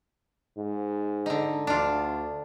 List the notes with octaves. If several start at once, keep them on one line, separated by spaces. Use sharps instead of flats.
G#2
D3 D#4
D2 D4 F4